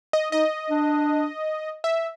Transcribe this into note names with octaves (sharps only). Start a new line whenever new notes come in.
D#5
D#4 D#5
D4
E5